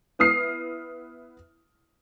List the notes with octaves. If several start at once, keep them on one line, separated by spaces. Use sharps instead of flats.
B3 E4 D#6 F6 C7